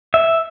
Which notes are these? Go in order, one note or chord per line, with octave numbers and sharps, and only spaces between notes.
E5